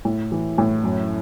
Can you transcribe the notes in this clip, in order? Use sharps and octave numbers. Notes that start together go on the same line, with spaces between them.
A2
E3
A2
F#2